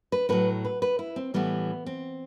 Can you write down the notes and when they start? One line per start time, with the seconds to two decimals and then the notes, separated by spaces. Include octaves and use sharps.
0.12 B4
0.29 A2 F#3 B4
0.65 B4
0.82 B4
0.99 E4
1.16 C4
1.34 A2 E3 G3 B3
1.86 C4